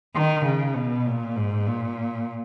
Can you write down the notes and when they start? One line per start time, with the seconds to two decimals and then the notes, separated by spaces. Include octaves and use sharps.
0.16 D#3
0.46 C#3
0.76 B2
1.06 A#2
1.36 G#2
1.67 A#2